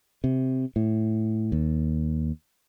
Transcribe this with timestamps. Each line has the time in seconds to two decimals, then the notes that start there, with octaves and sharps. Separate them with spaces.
0.24 C3
0.76 A2
1.52 D#2